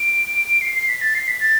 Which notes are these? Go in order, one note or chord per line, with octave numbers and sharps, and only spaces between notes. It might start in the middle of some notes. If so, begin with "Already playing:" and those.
Already playing: D7
C7
C7
B6
A6
C7
B6
A6